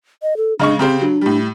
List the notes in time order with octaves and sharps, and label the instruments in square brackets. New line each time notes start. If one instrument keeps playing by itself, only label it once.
[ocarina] D#5
A4
[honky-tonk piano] C#3 G#3 C#6 [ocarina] D4
[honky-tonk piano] C#3 G4 C5 [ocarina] C4
[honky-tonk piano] F#3 [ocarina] D4
[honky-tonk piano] A2 G3